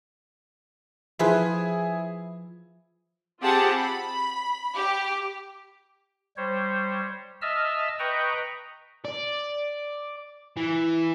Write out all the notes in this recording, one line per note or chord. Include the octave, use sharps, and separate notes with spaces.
F3 E4 G#4 B4 C5
C4 F4 G4 G#4 F#5 A5
B5
G4
G3 C5 C#5
D#5 E5 A5 E6 F6
B4 D#5 G5 A#5 C#6
D5
E3